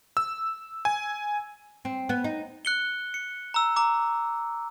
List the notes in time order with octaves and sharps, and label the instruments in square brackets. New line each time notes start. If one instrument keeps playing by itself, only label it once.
[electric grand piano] E6
G#5
[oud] C4
B3
D#4
[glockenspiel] F#6 C#7 G7
C#7
A#5 E6
A#5 D6